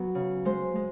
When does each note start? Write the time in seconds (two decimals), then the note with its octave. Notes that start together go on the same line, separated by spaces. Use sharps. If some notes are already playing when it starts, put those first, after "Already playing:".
Already playing: F#3 B3
0.15 C#3
0.45 G#3 C5
0.76 G#3